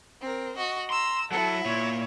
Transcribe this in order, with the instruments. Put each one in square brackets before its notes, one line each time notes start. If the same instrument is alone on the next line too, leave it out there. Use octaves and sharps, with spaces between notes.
[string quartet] C4 A#4
F#4 D#5
[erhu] A#5 [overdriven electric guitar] C6 [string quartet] E6
[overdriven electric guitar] F#3 F#5 [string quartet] E4 [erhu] A4
[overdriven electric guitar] A#2 [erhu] C#5